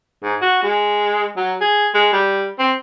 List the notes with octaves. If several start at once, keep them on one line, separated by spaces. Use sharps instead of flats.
G#2
F#4
G#3
F#3
G#4
G#3
G3
C4